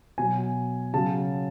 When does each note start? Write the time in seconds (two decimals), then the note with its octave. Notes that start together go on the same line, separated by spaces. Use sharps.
0.18 B2 F#3 G#5
0.93 C#3 F#3 A5